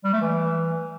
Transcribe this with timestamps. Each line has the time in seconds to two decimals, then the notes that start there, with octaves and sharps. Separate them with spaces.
0.04 G3
0.13 A3
0.21 E3